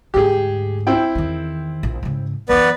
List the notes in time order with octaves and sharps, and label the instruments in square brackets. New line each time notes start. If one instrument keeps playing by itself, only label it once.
[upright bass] D2 G#2 [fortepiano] G4 G#4
[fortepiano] C4 E4 G5
[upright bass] E2 D#3
A#1
G#2 C#3
[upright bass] F#2 E3 [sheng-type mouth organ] B3 B4 D5